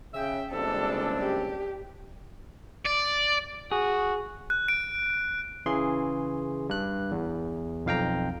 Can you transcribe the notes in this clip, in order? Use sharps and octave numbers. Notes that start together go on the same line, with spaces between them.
C#3 E5 G5
F#1 C#2 G3 C4 D4 A4
G4
D5
F#4 G#4
F#6
D7
C#3 E3 G#4 C6
G2 F#6
E2
B1 F2 F5 G5 A#5